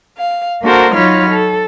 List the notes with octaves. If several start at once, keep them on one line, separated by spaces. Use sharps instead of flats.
F5
A#3 D4 F#4 A4 A#4 C5
F#3 D#4 F4 C#5 B5 F6
A4